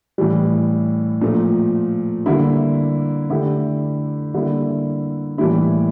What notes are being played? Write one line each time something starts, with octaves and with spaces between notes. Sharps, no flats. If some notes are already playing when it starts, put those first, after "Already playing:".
A2 E3 G3
A#2 F3 A3
D3 G3 A#3 E4
D3 A3 E4 G4
D3 G3 A#3 E4
A2 E3 G3 A#3 E4